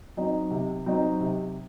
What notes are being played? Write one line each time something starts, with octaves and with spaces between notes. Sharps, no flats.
F#3 C4 D#4
C3
F#3 C4 D#4
C3